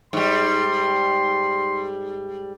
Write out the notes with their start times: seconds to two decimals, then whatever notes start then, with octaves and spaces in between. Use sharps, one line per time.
0.13 G#2 G3 C6